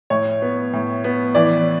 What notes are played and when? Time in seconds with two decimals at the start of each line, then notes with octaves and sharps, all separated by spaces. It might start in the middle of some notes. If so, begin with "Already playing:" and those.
0.10 A2 C#5
0.42 B3
0.73 A2
1.04 B3
1.35 E3 D5